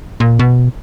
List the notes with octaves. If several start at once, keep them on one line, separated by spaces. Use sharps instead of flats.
A#2
B2